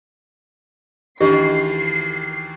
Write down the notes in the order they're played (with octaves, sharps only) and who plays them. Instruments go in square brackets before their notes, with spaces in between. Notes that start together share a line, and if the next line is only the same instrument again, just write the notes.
[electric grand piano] D2 D#3 E3 [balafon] D4 D#5 [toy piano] G4 [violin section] C7